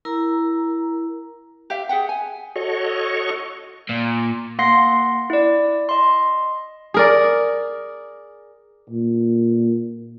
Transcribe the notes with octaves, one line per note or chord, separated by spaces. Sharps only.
E4 A#4 A#5
G4 E5 F5
G#4 E5 F#5 G5
G#5
F#4 A4 C#5 D#5 C#6
A#2
A#3 F#5 C6 A#6 C7
E4 D5
D#5 C6
G#4 A#4 D5
A#2